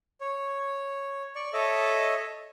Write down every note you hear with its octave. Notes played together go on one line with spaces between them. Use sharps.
C#5
D5 C#6
A4 C#5 D#5 E5 A5